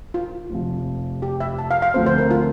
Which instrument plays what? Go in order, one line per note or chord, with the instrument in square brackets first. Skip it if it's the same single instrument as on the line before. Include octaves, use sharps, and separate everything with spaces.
[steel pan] F4
[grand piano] F1 F2 C3 F3
[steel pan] G4
E5
A5
F5
F5
[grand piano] D2 D3 F3 A3 C4 [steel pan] C5
[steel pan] C5
A#4
F4